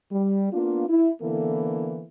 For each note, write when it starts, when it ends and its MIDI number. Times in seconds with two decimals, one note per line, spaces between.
0.11 0.48 55
0.53 0.88 58
0.53 0.88 59
0.53 0.88 62
0.53 0.88 65
0.89 1.10 64
1.22 2.04 50
1.22 2.04 52
1.22 2.04 58
1.22 2.04 59
1.22 2.04 64
1.22 2.04 69